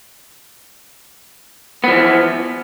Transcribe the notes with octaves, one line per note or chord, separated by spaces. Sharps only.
E3 F3 B3